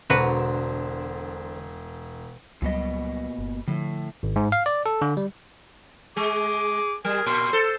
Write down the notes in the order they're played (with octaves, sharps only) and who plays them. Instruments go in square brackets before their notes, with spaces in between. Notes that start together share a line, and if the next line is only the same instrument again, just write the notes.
[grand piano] E1 A#5 [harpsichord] D3 C4 [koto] F#4 B4
[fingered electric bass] C#2 F#3 G3 [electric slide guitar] A#2 B3 D#5
[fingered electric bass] G1
[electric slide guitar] A2 [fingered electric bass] D3 F3
[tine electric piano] G#1
G#2
F5
D5
A4
D3
G3
[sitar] G#3 [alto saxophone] G#4 [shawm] D6
[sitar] G3 [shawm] G#4 [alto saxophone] A#4
[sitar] A#2 [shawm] C6
[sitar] A4 [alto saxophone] C5